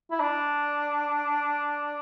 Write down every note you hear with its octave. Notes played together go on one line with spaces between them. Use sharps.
E4
D4